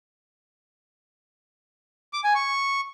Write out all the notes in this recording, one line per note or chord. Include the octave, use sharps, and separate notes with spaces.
D6
G#5
C#6